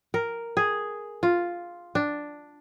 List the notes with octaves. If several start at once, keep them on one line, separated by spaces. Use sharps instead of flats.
A#4
G#4
F4
D4